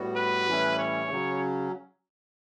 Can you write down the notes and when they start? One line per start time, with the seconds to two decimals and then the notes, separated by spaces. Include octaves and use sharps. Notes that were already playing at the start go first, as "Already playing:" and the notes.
Already playing: A2 G3 B3 F#4
0.16 B4
0.47 A2 E3 G3 C#4 E4
0.79 C#5
1.10 C#3 F#3 C#4